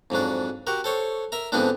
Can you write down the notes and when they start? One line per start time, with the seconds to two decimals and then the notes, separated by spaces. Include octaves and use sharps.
0.10 F2 G#2 F#3 D4
0.67 F#4 G4 A#4
0.84 A4 C5 C#5
1.32 A#4 E5 A#5
1.52 G#2 D3 F3 B3 C4 D4